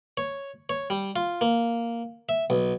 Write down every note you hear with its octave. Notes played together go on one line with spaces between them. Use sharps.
C#5
C#5
G3
F4
A#3
E5
B1